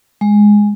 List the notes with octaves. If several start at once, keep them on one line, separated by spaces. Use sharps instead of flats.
G#3